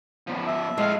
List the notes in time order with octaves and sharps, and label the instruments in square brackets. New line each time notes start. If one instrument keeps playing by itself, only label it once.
[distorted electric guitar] F3 B3
[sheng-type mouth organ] E5
[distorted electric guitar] A2 F5 [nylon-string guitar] G#3